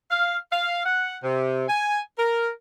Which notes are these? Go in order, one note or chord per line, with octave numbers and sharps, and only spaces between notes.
F5
F5
F#5
C3
G#5
A#4